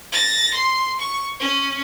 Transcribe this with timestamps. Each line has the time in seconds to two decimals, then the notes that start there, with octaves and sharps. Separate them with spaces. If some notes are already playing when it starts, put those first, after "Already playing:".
0.12 A6 A#6
0.53 C6
0.99 C#6
1.40 C#4